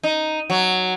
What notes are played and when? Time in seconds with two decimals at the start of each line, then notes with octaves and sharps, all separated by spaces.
0.03 D#4
0.50 F#3